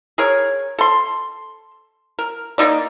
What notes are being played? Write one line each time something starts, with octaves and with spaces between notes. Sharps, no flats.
G#4 A#4 C#5
A4 C6
A#4
A#3 B3 D#4 D5